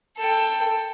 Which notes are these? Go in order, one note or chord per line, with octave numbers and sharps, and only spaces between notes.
A4 G5